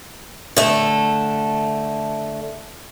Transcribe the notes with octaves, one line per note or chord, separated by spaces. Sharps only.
D3 A3